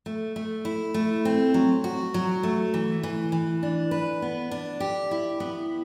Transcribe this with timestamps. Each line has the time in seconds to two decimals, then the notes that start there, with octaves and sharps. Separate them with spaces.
0.06 A3
0.36 A3
0.65 E4
0.94 A3
1.25 C4
1.54 F#3
1.84 F#4
2.14 F#3
2.43 A3
2.74 E3
3.03 E3
3.32 E3
3.63 D4
3.91 B4
4.22 B3
4.51 D4
4.80 G4
5.11 E4
5.40 B3